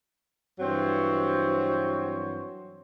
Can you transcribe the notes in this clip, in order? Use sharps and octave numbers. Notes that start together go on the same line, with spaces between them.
G2 E3 F#3 C4 C5 C#5